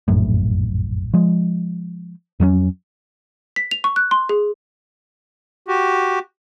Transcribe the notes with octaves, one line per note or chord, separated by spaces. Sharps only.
F1 A#1 F#2 A2
F3 G#3
F2 F#3 A3 C#4
B6
F7
C#6
F#6
C6
G#4
F#4 G4